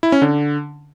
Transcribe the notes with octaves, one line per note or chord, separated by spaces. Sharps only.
E4
C#4
D3